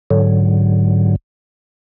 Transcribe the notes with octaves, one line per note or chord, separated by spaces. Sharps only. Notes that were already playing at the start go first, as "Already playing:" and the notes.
G#2 D3 F#3